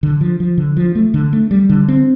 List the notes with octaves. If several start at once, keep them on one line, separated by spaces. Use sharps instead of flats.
D3
F3
F3
D3
F3
A3
D3
A3
G3
D3
C4